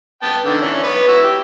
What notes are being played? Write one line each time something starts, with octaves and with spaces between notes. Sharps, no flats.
B3 G5 A5
D3 D#3
E3 C#4 D4
B3 B4 C#5
E4 F#4 E6
G4